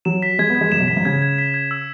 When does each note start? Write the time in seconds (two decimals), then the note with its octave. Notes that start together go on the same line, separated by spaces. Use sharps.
0.05 F#3 E7
0.22 B6
0.39 G#3 G#6
0.50 B3
0.55 G#6
0.61 G#3
0.72 F#2 E7
0.80 B2
0.88 F#2 B6
0.97 G#2
1.05 C#3 G#6
1.22 G#6
1.38 B6
1.54 G#6
1.71 E6